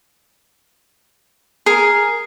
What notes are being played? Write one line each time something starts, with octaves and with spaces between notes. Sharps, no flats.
G#4 A#4